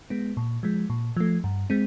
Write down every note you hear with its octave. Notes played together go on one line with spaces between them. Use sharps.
G#3 B3
A#2
F3 G#3
A#2
F3 A3
G2
G#3 C4